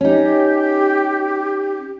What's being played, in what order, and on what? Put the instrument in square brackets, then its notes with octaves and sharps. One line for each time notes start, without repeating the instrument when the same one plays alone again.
[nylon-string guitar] C#4 D#4 [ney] G4